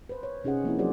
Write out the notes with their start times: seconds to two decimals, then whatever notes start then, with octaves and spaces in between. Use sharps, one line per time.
0.09 B4 C5
0.23 C#5
0.44 C3 C#4 D#4 G#4 D#5 F#5
0.64 F3 A#3 C4 E4
0.78 F#3 D4 F#4 G#4 C5 D5